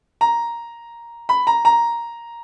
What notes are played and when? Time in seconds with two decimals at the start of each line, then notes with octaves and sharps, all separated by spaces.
0.21 A#5
1.29 B5
1.47 A#5
1.65 A#5